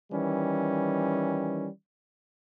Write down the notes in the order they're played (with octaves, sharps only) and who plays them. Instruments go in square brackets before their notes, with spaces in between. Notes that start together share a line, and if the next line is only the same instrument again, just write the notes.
[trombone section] D#3 E3 G3 C#4